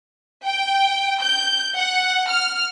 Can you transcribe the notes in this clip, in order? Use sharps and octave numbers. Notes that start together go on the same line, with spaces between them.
G5
G6
F#5
F6